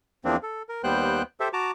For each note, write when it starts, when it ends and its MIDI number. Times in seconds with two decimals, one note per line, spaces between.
0.25 0.36 40
0.25 0.36 53
0.25 0.36 58
0.25 0.36 60
0.25 0.36 62
0.43 0.62 69
0.69 0.82 70
0.84 1.22 39
0.84 1.22 55
0.84 1.22 59
0.84 1.22 72
0.84 1.22 79
0.84 1.22 90
1.40 1.49 67
1.40 1.49 69
1.40 1.49 72
1.40 1.49 76
1.53 1.71 66
1.53 1.71 81
1.53 1.71 82
1.53 1.71 86